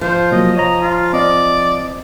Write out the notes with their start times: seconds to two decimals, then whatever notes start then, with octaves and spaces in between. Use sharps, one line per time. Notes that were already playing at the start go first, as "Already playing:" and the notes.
0.01 F3 C5
0.32 C3 F#3 A#3 D#5
0.57 C#5 D#5 A#5
0.82 F4
1.13 C4 D5 D#5